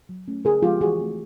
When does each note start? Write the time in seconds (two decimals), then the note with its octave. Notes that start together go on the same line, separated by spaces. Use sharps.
0.09 F#3
0.28 A3 C#4
0.45 C#3 G#4 A#4
0.63 F3 G#3 B3 F4 G4
0.81 E3 F#4 G#4
0.99 A3 C4